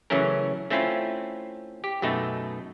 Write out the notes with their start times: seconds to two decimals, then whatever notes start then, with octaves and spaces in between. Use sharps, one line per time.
0.10 C#3 E3 F#3 A3 C#4 A#4
0.70 A3 C4 C#4 E4 F4
1.84 G4
2.02 F#2 B2 A3 D#4